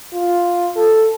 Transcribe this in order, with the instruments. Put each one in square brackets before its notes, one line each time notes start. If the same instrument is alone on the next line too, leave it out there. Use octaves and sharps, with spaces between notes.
[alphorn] F4
A4